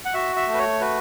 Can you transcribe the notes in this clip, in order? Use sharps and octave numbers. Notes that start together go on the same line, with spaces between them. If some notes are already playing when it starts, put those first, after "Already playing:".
F#5
F#4 E5
E5
A3
B4
C#5
F#4 B4